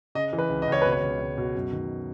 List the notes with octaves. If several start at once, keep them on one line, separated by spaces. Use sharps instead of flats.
C#3 D#5
E3
B4
C#2
D#5
C#2 C#5
B2 B4
C#5
C#2
C#2
B2
F#2
D#3